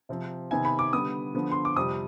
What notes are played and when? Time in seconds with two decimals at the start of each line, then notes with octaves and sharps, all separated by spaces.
0.09 C3 F3 C4
0.51 C3 D#3 B3 G#5
0.65 B5
0.79 D6
0.93 D3 G3 B3 D#6
1.34 D3 F3 B3
1.52 C6
1.65 D6
1.76 F2 C3 G3 D#6